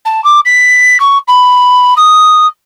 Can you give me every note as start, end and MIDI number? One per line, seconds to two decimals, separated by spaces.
0.05 0.23 81
0.24 0.40 86
0.45 1.00 95
1.00 1.18 85
1.28 1.94 83
1.97 2.47 87